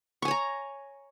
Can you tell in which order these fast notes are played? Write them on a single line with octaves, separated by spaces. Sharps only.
C#6 G#5 C#5 A#5